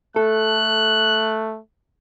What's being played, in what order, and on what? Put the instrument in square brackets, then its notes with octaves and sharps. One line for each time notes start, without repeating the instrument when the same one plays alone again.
[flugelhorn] A3 [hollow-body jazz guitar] A4 [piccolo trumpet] F#6